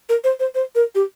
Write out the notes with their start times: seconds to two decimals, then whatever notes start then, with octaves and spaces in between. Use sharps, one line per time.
0.09 A#4
0.24 C5
0.40 C5
0.55 C5
0.75 A#4
0.95 G4